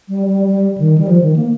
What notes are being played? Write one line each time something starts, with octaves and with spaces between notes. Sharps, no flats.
G3
G3
G3
D#3
G3
F3
D#3
A#3